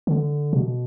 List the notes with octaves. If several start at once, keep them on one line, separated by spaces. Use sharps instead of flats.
D3
B2